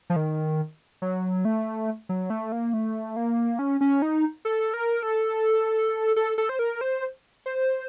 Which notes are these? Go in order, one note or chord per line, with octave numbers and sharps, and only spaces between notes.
F3
D#3
F#3
A3
F#3
A3
A#3
A3
A#3
C#4
C#4
D#4
A4
A#4
A4
A4
A4
C5
A#4
C5
C5